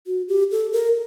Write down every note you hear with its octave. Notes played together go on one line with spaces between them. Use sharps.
F#4
G4
A4
A#4